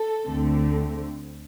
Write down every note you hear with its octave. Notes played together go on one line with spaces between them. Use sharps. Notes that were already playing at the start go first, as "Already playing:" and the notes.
Already playing: A4
D2 D3 A3 C4